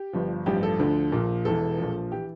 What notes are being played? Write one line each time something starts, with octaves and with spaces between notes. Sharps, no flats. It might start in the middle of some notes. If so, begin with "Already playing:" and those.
Already playing: G4
G1 G2 F3
A1 G2 F3 G4
A4
D2 D3 F3
A#1 A#2 F3
E1 E2 E3 A4
A#1 A#2 F3
E3 G4